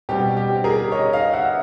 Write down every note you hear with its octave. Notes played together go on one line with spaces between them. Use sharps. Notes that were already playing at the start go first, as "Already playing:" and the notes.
B2 G3 C4 G4
G4
G#4 A#4
C#5 D#5
D#5 F5
E5 F#5